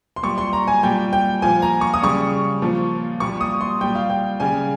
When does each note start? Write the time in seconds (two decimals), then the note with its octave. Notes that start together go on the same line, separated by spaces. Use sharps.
0.16 C6
0.23 A#2 G3 C#6
0.38 C6
0.53 A#5
0.67 G#5
0.83 A#2 G3 G5
1.13 G5
1.42 A#2 F3 G#5
1.62 A#5
1.81 C#6
1.94 D#6
2.02 C#3 G3 C#6
2.62 A#2 F3
3.20 A#2 G3 C#6
3.41 D#6
3.61 C6
3.81 A#2 G3 G5
3.95 F5
4.10 G5
4.40 C#3 G3 G#5